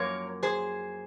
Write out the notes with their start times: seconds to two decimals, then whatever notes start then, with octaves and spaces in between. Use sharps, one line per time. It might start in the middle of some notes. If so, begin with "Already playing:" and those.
Already playing: F#2 F3 A#3 A#4 C#5
0.43 G#4 C5